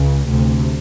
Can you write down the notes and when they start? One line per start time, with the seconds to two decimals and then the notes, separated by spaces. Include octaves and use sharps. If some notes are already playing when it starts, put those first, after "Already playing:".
Already playing: C#2 C#3
0.27 D2 C3